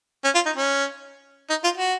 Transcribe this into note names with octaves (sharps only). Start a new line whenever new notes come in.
C#4
F4
D#4
C#4
D#4
F4
F#4